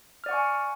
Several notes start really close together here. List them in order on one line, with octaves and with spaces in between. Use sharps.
F6 D5 F#5 C#6 G#5